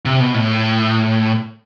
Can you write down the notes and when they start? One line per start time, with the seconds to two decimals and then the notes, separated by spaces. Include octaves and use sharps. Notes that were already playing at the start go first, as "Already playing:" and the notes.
0.05 C3
0.20 B2
0.34 A2